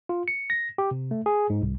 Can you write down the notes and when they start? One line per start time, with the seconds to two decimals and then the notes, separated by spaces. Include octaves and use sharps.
0.09 F4
0.28 C#7
0.50 A#6
0.78 G4
0.91 C3
1.11 A3
1.26 G#4
1.50 G#2
1.62 C2